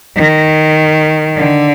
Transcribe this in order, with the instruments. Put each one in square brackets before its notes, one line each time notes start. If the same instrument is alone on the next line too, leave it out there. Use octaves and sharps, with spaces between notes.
[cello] D#3
D3